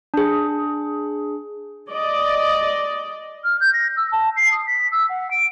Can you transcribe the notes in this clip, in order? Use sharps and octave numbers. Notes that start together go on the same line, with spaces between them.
D4 G#4
D5 D#5
F6
G6
A#6
E6
A5
C7
D#6
B6
E6
F#5
D7